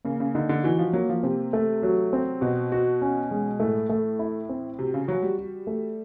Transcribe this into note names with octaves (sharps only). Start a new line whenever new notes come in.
C#3 A#3
C#3
D3 D#4
D3
E3 F#4
F3
F#3 A#3
F3
C3 C4
A3
F#3
C4
B2 F#4
F#4
C#4
G#3
A2 A3
A3
E4
C4
C3 F#4
C#3
F#3 F#4
G3
F#4
A3